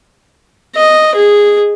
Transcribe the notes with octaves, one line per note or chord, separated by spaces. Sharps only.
D#5
G#4